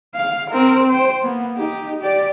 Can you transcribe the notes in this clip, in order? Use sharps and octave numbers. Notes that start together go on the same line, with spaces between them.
F5
C4 A#4
C5 G5
A#3 B3
D#4 G4
G4 D5